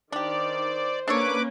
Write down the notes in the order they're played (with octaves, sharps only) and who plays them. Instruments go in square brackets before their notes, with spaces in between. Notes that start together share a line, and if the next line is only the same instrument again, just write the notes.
[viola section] D#3 [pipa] D4 G4 [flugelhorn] C5 [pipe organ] D5
[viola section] A#3 C#4 [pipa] D4 A4 C#5 [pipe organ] B4 D6